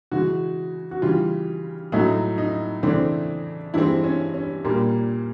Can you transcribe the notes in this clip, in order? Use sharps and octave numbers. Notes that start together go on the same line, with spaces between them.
C#3 E3 G#3 F#4
F#4
C#3 E3 G3 F4
A2 F#3 A3 D#4
D#4
C#3 E3 A3 C4 D4
G2 E3 G#3 C4 E4
C#4
C#4
A#2 G3 A#3